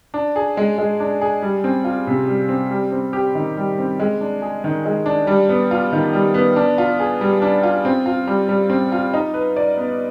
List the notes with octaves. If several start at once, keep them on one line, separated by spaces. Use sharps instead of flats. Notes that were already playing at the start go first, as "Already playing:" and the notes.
D4
G#4
G#3
G#3
D4
G#4
G3
C4
F4
C3
G3
C4
G3
C4
G4
D#3
G3
C4
G#3
D4
G#4
D#3
G#3
D4
G3
B3
F4
D#3
G3
B3
D4
F4
G#4
G3
D4
F4
C4
F4
G3
G3
C4
F4
D#4
B4
D5
B3